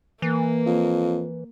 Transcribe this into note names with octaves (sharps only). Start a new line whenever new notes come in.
E3 A#3
F2